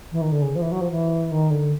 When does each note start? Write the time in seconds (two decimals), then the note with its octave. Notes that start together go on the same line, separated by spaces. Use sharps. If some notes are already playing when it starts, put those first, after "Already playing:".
0.11 E3
0.21 D#3
0.31 D3
0.42 C#3
0.55 F3
0.61 E3
0.71 F#3
0.81 F3
0.90 E3
1.31 D#3
1.50 D3